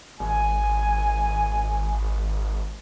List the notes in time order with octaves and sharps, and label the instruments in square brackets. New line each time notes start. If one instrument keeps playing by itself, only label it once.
[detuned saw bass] G#1 [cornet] G#5